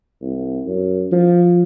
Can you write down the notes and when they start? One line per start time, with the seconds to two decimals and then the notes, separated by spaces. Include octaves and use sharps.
0.22 C2
0.67 F#2
1.12 F3